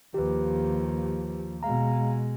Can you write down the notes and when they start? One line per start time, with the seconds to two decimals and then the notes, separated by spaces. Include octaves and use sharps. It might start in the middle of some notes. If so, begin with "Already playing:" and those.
0.14 D#2 F3 G4 B4
1.63 B2 G#3 F5 A#5